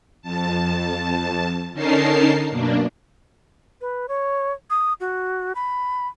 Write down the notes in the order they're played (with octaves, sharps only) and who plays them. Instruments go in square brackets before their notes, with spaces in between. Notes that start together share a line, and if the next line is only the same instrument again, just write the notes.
[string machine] F2 A5
D3 C#4 D#4 A#4 A5 C7
F#2 B2 A#3 D4
[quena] B4
C#5
D#6
F#4
B5